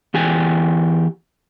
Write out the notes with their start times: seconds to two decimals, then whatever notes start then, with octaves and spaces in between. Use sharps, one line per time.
0.14 E2 G4 G#5